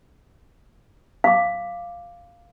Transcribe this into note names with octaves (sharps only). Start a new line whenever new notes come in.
F5 D6